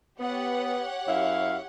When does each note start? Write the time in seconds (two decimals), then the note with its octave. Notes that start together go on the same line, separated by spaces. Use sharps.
0.20 B3 G4 C#5 F#5
1.08 F#2 E4 F5